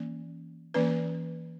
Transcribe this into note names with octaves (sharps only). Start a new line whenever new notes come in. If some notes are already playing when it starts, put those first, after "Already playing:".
Already playing: E3 A#3 C#4
E3 A#3 C#4 B4